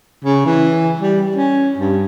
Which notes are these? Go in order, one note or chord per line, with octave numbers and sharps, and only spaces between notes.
C#3
E3
G3
C#4
G2